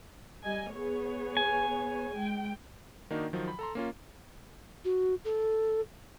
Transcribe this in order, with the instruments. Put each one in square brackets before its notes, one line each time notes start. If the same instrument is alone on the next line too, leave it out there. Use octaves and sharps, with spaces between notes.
[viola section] G3 D#5 G#5
B3 G#4 C#5
[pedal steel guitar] G#5
[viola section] G#3 G5
[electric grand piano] D#3 A#3 D4 D#4 F#4
D#3 F3 F#3
B5
A4 A#5 C6
A#3 C#4 F4
[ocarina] F#4
A4